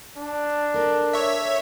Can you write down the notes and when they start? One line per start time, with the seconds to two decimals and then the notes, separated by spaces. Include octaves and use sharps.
0.17 D4
0.74 A4 A#4
1.13 C#5 E5